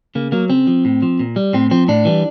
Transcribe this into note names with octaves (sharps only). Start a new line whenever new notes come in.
C#3 A#3
F#3 A#3
C#3 C4
F3
A2
F3
A#2
G3
A2 C4
F3 C4
A2 D4
E3 G3